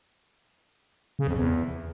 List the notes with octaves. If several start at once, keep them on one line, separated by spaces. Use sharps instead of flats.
C#3
F2
E2